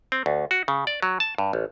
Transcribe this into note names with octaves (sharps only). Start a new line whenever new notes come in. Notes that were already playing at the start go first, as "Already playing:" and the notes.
C4
D2
F#4
C#3
D5
F#3
A5
G2
A1